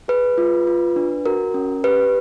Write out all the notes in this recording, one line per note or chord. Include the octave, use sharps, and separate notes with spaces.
G#4 B4
F4
F4
D4
F#4 A#4
C#4
G4 B4